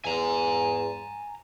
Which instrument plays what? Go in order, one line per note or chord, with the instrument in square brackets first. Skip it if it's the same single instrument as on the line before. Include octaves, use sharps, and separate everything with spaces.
[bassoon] E2 [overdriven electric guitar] G#5 A#5